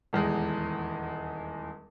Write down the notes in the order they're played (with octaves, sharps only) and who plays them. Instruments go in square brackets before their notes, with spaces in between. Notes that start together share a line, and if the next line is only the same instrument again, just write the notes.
[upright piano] D#1 E2 G#3 D#5